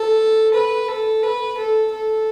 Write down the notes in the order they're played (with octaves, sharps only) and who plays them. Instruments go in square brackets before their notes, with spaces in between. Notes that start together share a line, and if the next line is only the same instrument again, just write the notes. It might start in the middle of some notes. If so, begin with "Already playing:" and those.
Already playing: [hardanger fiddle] A4
B4
A4
B4
A4
A4